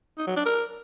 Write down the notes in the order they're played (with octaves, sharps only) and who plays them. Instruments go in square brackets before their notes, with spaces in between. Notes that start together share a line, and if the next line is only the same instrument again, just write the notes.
[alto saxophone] D#4
F#3
D4
A#4